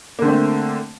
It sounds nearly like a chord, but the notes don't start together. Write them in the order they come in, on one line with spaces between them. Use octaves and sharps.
A#3 D3 C4 A3